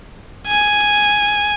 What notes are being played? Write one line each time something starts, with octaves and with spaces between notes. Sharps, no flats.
G#5